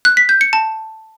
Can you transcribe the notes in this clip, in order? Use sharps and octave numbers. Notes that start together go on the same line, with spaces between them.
F#6
B6
G6
C#7
A5